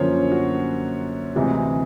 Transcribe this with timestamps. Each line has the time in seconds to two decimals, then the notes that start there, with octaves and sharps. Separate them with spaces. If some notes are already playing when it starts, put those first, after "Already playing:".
Already playing: F#2 D3 F3 A#3 C#4 C5 C#5
0.32 F#4
1.35 D2 C3 E3 G#3 C4